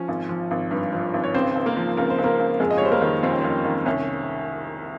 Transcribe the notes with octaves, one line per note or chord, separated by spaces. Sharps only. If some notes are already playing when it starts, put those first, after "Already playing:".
Already playing: F3 C#4
G#1
F3
G#1
G2
F3
G#1
C#5
C#2 C4 C5
C#2
A#3 A#4
F3
C#2 A#4
C5
C#2
A#3 A#4
C#2
F2 G#3 G#4
D#5
C#5
G3 C5
A#3 A#4
D#3
F2 C4
C#4
F2 C4
D#3
C2 C#4